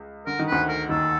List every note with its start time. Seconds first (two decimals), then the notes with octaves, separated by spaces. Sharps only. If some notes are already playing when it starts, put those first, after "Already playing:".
Already playing: C#2
0.26 D3 A#4
0.39 D#3
0.47 D2 D3 B4
0.68 A#4
0.89 D#2 D#3 A4